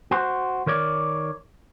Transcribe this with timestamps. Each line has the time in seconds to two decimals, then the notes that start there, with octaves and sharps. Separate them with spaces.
0.11 F#4 C5
0.66 D#3 A#4 C#5 D5